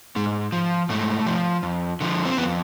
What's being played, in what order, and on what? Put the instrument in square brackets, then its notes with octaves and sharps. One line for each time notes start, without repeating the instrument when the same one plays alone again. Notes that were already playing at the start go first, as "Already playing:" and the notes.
[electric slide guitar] G#2 G#3
F3
G#2 A3
F3
F2
D3 F3
C4
F2 B3